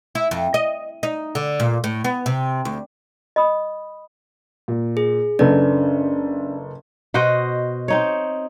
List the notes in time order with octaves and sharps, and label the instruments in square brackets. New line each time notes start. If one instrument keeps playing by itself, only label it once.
[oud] E4
F2
D#5
D#4
D3
A#2
A2
B3
C3
D2
[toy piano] D#5 B5 D#6
[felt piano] A#2
[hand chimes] G#4
[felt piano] F#1 A4 B4 [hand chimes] C#4 D4 D5
[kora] B2 F#4 C5 D#5
C4 D#4 C#5